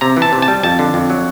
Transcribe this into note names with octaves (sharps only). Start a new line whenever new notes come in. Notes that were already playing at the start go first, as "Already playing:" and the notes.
C3 A#5
E3
A5
C3
A5
G3
F2 A5
D3
F2
F#3